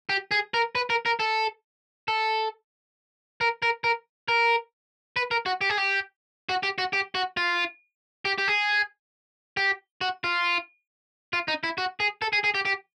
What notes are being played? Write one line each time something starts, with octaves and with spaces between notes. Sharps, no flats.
G4
G#4
A#4
B4
A#4
A#4
A4
A4
A#4
A#4
A#4
A#4
B4
A#4
F#4
G4
G#4
G4
F#4
G4
F#4
G4
F#4
F4
G4
G4
G#4
G4
F#4
F4
F4
D#4
E4
F#4
G#4
A4
G#4
G#4
G4
G4